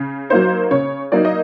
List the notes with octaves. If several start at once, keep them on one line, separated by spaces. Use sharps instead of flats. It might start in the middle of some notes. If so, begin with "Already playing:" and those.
Already playing: C#3
F#3 A#3 D#4 C5
C#3 C#5
F#3 A#3 D#4 D5
D#5